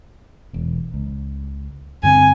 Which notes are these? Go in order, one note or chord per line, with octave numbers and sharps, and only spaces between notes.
E1 E2
C#2
G2 D3 C4 G#5